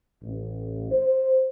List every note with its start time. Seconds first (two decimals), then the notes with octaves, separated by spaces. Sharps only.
0.22 A1
0.92 C5